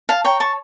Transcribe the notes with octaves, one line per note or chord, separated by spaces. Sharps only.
F5 A5
C#5 G5 A#5
A5 C#6